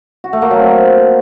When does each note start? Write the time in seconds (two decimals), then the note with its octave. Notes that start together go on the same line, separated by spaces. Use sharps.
0.24 F#4
0.33 A3
0.42 A#3
0.51 F#3
0.60 C4